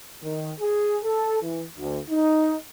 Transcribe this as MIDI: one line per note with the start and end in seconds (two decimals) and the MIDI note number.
0.22 0.53 51
0.60 0.98 68
1.04 1.38 69
1.42 1.65 52
1.79 1.99 38
2.10 2.56 63